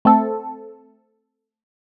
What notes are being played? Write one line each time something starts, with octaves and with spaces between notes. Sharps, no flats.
A3 C4 A4